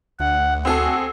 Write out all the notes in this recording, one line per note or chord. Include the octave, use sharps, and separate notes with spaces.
D2 F#5
C4 F#4 G#4 A4